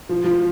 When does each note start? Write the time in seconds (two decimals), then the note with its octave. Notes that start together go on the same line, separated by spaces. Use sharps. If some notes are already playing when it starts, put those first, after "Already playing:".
0.09 F3
0.24 F3